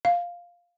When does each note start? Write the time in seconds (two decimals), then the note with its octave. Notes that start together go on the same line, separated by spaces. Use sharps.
0.05 F5